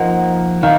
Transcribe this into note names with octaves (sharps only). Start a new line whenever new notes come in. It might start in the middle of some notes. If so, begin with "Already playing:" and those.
Already playing: F3 A#3 D#4 F#5
D#3 F5